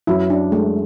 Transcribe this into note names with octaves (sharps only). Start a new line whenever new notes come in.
F#2 E4
D4
G#3 A3